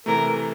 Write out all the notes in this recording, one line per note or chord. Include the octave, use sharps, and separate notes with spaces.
C3 E3 A3 A#4